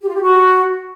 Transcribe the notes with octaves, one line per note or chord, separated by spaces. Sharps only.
G4
F4
G4
F#4